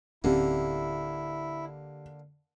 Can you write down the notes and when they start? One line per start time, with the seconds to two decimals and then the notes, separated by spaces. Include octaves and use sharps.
0.24 D1 D3 A#3 C4 C#4 E4 G4